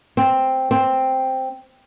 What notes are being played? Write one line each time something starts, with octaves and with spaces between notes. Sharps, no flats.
C4
C4